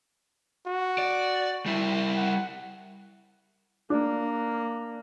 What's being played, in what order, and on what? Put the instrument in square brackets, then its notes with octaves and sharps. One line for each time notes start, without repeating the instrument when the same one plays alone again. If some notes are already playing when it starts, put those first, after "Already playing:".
[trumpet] F#4
[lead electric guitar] D5
G3 E4
[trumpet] F#5
[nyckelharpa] A#3 [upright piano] D4